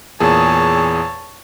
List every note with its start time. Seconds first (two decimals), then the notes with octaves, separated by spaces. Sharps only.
0.20 E2 A#2 G#4 C#5 A5